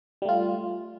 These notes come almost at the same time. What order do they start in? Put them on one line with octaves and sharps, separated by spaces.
G3 A3 F4